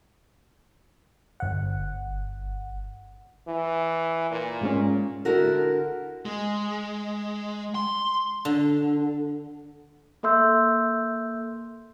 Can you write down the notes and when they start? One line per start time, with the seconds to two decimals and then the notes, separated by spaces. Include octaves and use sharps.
1.40 G1 F#5
3.48 E3
4.31 A#2
4.61 G#2 G#3 C#4
5.25 D3 E4 F#4 A#4
6.25 G#3
7.75 C6
8.45 D3
10.23 A#3 A4 E5 C6 E6 G6